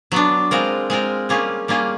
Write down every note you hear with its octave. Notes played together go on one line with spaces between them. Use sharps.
F#3 B3 D4
G#3 C4 F4 A#4
G#3 C4 F4 A#4
G3 A#3 C#4 F4 G#4
G3 A#3 C#4 F4 G#4